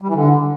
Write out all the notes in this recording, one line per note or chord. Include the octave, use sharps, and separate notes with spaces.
G3
E3
D3